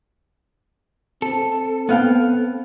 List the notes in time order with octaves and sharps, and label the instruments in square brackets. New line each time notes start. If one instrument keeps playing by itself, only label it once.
[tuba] C4 [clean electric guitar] A4
[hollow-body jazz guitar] B3 F5 G5